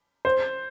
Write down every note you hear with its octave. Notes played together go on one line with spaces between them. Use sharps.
C5